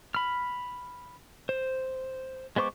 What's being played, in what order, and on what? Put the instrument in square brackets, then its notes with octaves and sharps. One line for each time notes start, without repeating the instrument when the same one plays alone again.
[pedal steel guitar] B5 F6
C5
G#3 B3 C5 C#6 D6